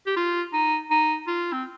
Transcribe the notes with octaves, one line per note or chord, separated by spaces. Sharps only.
G4
F4
D#4
D#4
F4
C4